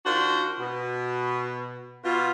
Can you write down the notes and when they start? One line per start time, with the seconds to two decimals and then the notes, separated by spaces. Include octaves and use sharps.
0.05 D#3 D4 F4 F#4 C5
0.59 B2
2.04 B2 F4